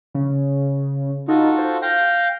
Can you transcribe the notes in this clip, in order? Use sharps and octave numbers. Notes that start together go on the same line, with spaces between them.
C#3
D#4 F4 F#4 A4
C5
F5 G5 A#6